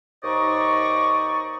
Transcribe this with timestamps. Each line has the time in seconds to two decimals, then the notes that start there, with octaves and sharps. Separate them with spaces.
0.24 D#2 D#4 C5 D5 D#5 C#6